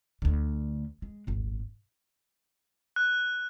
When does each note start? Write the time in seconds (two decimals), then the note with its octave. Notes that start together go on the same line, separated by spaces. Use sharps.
0.22 D2 D3
1.02 G#3
1.27 D#1 G#1
2.96 F#6